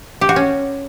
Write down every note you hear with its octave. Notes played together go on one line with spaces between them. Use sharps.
G4
F#4
C#4